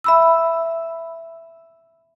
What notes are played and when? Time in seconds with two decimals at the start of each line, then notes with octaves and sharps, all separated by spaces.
0.04 E5 B5 E6